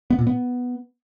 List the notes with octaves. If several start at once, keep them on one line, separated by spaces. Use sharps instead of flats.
B3
A#2
B3